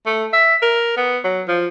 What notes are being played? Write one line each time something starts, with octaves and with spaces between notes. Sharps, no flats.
A3
E5
A#4
B3
F#3
F3